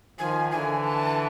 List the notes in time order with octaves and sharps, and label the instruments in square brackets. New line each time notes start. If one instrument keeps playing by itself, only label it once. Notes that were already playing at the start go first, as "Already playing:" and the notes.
[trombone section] D#3 F3 [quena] G#5
[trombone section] D3 E3 [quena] G#5
[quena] A5